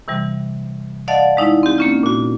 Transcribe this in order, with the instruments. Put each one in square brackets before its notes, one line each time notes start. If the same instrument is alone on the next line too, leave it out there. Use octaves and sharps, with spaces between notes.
[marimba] C3 E3 G3
D5 D#5 F5 F#5 A5 A6
G#3 D#4 E4
C4 G4
A#3 C#4 F4
A#2 F#4